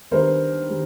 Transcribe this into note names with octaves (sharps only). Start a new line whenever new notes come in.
D#2 D#3 G3 B3 D4 A#4 C5
D#3 G3